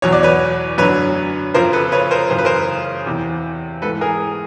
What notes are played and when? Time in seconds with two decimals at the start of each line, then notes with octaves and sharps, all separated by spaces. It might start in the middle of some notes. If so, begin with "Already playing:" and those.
0.02 E2 B2 F#3 C#5
0.12 D5
0.23 B4 C#5
0.78 F#2 D3 F#3 B4 C#5
1.54 F2 C#3 F3 A#4 C5
1.73 A4 B4
1.92 B4 C#5
2.11 A#4 C5
2.30 F#2 C#3 E3 C5
2.39 B4
2.45 A#4 C5
3.06 E2 C3 E3
3.82 G#2 A4 B4
3.87 E3
4.01 G#4 A#4